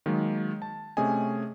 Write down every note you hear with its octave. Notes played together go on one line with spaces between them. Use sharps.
D#3 F#3 G#3 A#3
A5
C3 A3 C#4 G#4 D#5 G#5